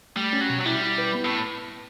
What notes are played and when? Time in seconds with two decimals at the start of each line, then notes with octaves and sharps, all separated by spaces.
0.16 G3 A3
0.33 C#4
0.41 F#3
0.50 B2
0.61 F#3
0.65 G3 E4
0.82 E4
0.98 B4
1.15 B3
1.25 A2